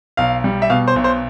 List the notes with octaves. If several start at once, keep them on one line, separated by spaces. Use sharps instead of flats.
B1 F5
G3
E5
B2 F5
C5
B1
C5